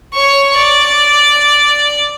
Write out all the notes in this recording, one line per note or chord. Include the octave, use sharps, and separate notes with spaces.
C#5 C#6
D5